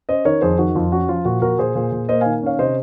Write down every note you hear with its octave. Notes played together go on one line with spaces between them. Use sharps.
C#4 C5 D#5
D#3 A#4 C#5
F2 G#4 C5
D#3 F#4
F2 F4
C#4 F#4
F3 F4
A#2 F#4
A#2 F#4 A#4
A#2 G#4 C5
A#2
A#2
A#3 C5 D#5
D#3 F5 G#5
C#4 C#5 F5
C3 C5 D#5